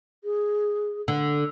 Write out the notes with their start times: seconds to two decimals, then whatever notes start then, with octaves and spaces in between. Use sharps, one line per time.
0.24 G#4
1.08 D3